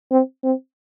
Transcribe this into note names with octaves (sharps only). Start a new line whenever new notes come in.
C4
C4